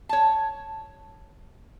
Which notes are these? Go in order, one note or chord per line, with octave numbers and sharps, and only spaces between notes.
C#5 A5